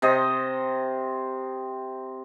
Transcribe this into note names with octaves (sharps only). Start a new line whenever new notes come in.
C3 C5 D#5